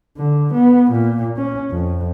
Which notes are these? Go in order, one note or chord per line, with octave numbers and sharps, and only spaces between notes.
D3
B3
A#2
C#4
F2